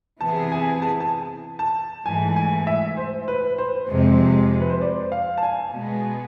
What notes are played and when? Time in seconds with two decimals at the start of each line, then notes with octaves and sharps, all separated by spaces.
0.21 C3 E3 B3 E4 G#4 A5
0.52 G#5
0.82 A5
1.00 A5
1.59 A5
2.05 G#2 E3 A3 G#5
2.36 G#5
2.67 E5
2.97 C5
3.28 B4
3.58 C5
3.89 F2 C3 G#3
4.60 B4
4.70 C5
4.81 D5
5.12 F5
5.38 A5
5.43 G#5
5.73 B2 G#3 B3